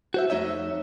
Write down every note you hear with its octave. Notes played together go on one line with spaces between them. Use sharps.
F#4 C5 E5
F2 A3 D#4 C#5 E5